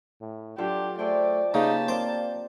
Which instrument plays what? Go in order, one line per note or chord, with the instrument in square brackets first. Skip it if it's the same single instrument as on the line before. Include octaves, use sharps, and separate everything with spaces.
[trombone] A2
[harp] F#3 F4 A4 [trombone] D4 [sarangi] G4
[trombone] A3 [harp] G#4 C5 G5 [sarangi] D5
[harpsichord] C#3 [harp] A#3 G4 B4 [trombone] D#4 [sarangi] A5
[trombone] A#3 [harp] C4 D5 D6 [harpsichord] C5